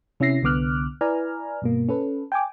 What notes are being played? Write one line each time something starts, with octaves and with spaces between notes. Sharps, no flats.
C3 C#4 E4 E5 A#6 C7
C2 D3 B3 D6 F6 F#6
E4 B4 D5 G#5 A#5 F6
G2 B2 A#3
C#4 A4 B4
G5 G#5 D6